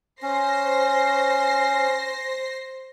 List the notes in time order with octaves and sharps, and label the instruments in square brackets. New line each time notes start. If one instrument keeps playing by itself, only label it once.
[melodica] C#4 [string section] C5 A#6 C7